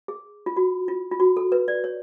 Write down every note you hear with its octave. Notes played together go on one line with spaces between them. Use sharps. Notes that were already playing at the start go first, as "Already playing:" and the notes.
G#4
F4
F#4
F4
F4
F#4
A4
B4
D5
C#5